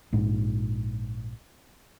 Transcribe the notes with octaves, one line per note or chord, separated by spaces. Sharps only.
A#1 G#2 G#3